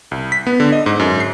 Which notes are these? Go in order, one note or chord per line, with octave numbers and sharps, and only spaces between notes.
C2
B6
B3
D3
D#5
G#2
F#2
C7